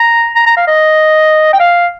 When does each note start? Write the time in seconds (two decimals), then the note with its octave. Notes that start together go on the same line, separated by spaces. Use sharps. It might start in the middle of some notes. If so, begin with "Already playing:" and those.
Already playing: A#5
0.35 A#5
0.46 A#5
0.57 F5
0.67 D#5
1.53 G5
1.60 F5